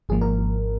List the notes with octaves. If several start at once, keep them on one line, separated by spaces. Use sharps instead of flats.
G#1 G#2 F3 A#3 G#4
A#4